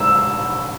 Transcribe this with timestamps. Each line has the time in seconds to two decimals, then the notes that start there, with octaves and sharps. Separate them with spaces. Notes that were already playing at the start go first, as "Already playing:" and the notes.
Already playing: E6